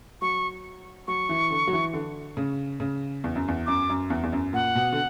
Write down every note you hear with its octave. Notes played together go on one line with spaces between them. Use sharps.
F#3 C#6
F#3 C#6
E3
D3
F#3
E3
D3
C#3
C#3
E2
F#2
E2
F#2 D6
F#2
E2
E2
F#2
A#2 F#5
B2
D3